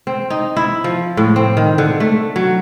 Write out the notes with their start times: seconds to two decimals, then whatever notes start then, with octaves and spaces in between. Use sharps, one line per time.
0.07 C4
0.30 D#4
0.57 E4
0.84 F3
1.17 A2
1.36 C4
1.57 D#3
1.78 D3
2.00 A3
2.36 F#3